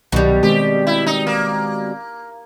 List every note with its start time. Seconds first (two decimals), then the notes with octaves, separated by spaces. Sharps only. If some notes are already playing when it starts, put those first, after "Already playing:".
0.12 C2 B2 D#3 F#3 G3
0.43 D#3 G#3 C4 G4
0.87 E4
1.07 D#4
1.27 A#3